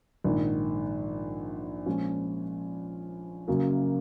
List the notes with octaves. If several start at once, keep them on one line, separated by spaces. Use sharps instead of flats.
A#1 G#2 D#3
A#2 F3 G#3 C#4
F#1 F#2 C#3 F#3 A#3